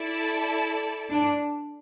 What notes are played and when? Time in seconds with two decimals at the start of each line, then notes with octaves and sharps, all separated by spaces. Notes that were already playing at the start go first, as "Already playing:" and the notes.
Already playing: E4 A4 D5 A5
1.10 D4